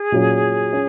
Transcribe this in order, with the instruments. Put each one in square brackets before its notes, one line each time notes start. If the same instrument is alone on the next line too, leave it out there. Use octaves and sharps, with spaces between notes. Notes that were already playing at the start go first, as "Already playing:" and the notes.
Already playing: [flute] G#4
[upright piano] A#2 F#3 C#4
C#4